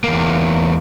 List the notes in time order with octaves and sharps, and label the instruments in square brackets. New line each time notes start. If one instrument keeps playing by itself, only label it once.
[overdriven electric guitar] E2 A#3